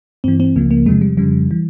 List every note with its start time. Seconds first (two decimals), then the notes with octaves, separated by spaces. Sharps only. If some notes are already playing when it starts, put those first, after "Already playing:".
0.24 G2 E3 C4
0.40 C4
0.55 C#2 C#3 F3 A#3
0.71 A#3
0.86 E2 C3 F3 G#3
1.01 G3
1.17 F2 C#3 F3 G3
1.51 E3